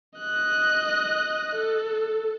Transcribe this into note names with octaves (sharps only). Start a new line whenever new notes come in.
D#5 F#6
A4